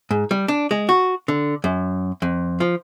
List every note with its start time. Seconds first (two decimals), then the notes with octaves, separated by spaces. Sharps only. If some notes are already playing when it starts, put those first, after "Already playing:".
0.11 G#2
0.31 G3
0.48 D4
0.71 G#3
0.89 F#4
1.28 D3
1.64 F#2
2.22 F2
2.60 F3